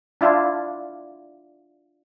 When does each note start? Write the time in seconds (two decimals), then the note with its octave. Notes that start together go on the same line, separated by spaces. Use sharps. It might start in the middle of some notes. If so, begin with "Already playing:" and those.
0.21 D4 E4 F4